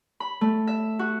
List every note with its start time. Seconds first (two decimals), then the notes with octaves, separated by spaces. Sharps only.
0.20 B5
0.41 A3
0.67 E5
0.99 F#4